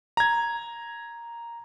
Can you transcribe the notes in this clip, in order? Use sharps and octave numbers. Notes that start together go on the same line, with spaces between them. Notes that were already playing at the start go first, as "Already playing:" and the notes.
A#5 G#6